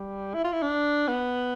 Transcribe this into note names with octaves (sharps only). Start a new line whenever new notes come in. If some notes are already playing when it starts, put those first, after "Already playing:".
Already playing: G3
E4
F4
E4
D4
B3